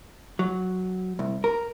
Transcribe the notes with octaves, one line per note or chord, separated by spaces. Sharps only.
F#3
C2
A#4